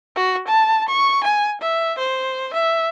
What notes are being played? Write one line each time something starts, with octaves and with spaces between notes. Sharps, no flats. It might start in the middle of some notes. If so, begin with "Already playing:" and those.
F#4
A5
C#6
G#5
E5
C5
E5